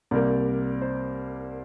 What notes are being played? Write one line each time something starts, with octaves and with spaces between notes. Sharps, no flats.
C2 C3 G3 A#3 A#4 D5
C5